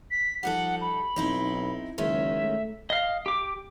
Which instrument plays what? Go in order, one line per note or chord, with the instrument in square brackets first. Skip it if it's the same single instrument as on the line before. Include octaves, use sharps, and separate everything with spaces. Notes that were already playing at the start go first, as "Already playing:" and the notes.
[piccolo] B6
[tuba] F3 [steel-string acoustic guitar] G3 D#4 A4 [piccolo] F#5
[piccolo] B5
[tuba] B1 [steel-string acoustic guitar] C4 D#4 E4
[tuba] F#1 [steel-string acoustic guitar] D#3 G#3 C#4 [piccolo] E5
[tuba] A3
[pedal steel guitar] D#5 F5
G4 D6